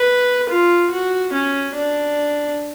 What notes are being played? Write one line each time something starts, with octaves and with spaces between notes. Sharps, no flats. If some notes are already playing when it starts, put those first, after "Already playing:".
Already playing: B4
F4
F#4
C#4
D4